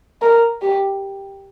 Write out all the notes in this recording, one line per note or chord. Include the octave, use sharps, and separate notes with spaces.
A#4
G4